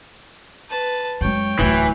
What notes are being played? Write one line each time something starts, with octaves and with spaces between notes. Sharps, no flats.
B4 A5
F#2 G#3 C#5 G5
D1 D2 E3